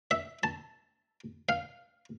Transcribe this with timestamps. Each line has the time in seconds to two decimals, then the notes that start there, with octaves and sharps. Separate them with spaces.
0.11 E5
0.43 A5
1.49 F5